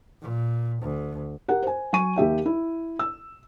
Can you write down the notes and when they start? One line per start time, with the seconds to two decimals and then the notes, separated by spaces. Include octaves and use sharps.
0.22 A#2
0.82 D2
1.48 G4 A#4 F#5
1.62 C5 G#5
1.93 F#3 G#5 C#6 D#7
2.16 D#2 G4 E5 G5
2.46 E4
2.99 E6